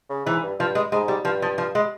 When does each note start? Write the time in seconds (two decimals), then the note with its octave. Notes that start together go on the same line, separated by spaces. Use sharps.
0.10 C#3
0.26 G#2 E3
0.43 G2
0.59 G2 F3
0.75 G#3
0.92 G#2 G#3
1.08 G3
1.25 G2 F3
1.42 F3
1.58 F3
1.75 G#3